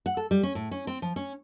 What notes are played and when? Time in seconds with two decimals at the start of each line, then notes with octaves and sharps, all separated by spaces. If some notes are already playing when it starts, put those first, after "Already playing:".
0.06 F#5
0.17 A4
0.31 G3
0.43 C#4
0.55 A2
0.71 C#4
0.87 C4
1.02 F3
1.16 C#4